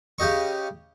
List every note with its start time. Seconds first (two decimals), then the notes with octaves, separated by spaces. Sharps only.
0.19 C#3 G4 D#5 C#6